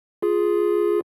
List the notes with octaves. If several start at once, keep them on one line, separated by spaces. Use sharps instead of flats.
F4 G#4